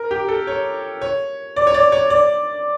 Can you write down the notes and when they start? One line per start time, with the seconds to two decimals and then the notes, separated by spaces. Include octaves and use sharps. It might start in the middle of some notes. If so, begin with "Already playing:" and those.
Already playing: A#4
0.11 G4
0.28 A4
0.47 C#5
1.01 C#5
1.56 D5
1.67 C#5
1.74 D5
1.92 C#5
2.10 D5